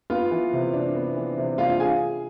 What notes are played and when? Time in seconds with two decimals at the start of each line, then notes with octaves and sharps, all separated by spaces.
0.10 B3 F4 F5
0.31 E3
0.53 C3
0.74 D4
0.95 B3
1.17 E3
1.38 C3
1.58 D4 F4 F5
1.70 F5
1.80 G#4 G#5